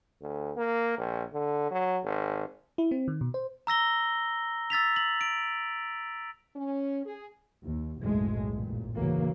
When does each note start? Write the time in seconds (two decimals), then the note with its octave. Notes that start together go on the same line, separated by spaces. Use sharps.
0.21 D2
0.56 A#3
0.98 A#1
1.33 D3
1.71 F#3
2.04 G#1
2.78 E4
2.91 C4
3.08 D#3
3.21 B2
3.34 C5
3.67 A#5 E6 A#6 G7
4.70 E6 A6 B6 F7
4.96 F#7
5.21 D7
6.56 C#4
7.06 G#4
7.64 D#2
8.02 F#1 B1 A2 G#3 A3
8.53 A1 A#2
8.96 D2 C#3 E3 F#3 A#3